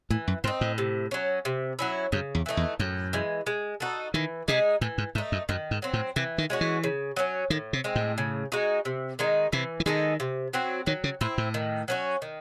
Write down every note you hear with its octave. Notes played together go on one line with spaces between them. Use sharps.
A2 E3
F#2
G#2 C4 D#4
A2
C3
F#3 C#4
C3
F#3 C#4 E4
F#2 C#3
E2
E3 A3 D#4
E2
F#2 A2
E3 G#3
G#3
D#4 F#4 A4
D#3 E3
C3 G#3 D#4 G#4
A2 E3
G#2
G#2 A3 D#4
F#2
F#2 D#3
G#2
F#3 C4
A2
C3 E3
D#3
G#3 C#4 F#4
E3
C#3
F#3 A3 C#4
A2 D#3
C3
G#3 C4
A2
C#3
G#3 D#4 F#4
C3
D#3 G#3 D#4
C3 E3
E3
D#3 G#3 D#4 A4
C3
F#3 C4 F#4
D#3 F#3
C#3
A2 C4 E4
A2
D#3
F#3 C#4 F#4
D#3